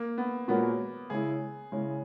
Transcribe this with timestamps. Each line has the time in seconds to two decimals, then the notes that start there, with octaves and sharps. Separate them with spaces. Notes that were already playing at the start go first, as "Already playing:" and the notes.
Already playing: A#3
0.18 B3
0.48 A#2 G#3 B3 C#4 F#4 A#4
1.10 C#3 G#3 C#4 E4 G#4
1.72 C#3 G#3 C#4 E4